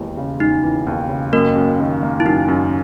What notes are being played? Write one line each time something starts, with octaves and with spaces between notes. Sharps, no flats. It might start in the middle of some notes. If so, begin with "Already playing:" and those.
Already playing: E1 D#2 E3
C#3
E1 D#4
E3
D#2
C#3
F#2 A#3 A#4
F#2
D#3
A#3
E4
F#2 D#4
F#2